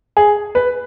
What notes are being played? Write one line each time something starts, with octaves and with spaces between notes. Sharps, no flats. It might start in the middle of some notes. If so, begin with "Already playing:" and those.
G#4
B4